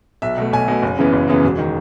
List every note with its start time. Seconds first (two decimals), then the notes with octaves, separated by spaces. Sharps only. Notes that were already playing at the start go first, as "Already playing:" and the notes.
0.22 B1 E5
0.38 B2 A3
0.52 B1 G#5
0.68 B2 A3
0.83 F#1
0.97 F#2 C#3 E3 B3
1.13 F#1
1.28 F#2 C#3 E3 B3
1.44 E1
1.58 D#3